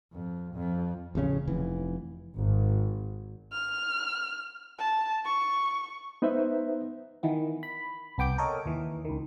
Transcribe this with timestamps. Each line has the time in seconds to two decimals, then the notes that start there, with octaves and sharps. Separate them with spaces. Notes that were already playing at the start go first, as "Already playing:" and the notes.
0.13 F2
0.54 F2
1.15 A1 F2 C#3 C#4
1.48 F1 E3
2.38 G#1
3.52 F6
4.79 A5
5.25 C#6
6.22 B3 D#4 B4 C5 E5
7.23 D#3 E3 B3
7.63 B5
8.18 C2 B3 G5 D6 G6
8.38 A4 A#4 C#5 D#5
8.66 D#2 E3
9.05 C#2 D#3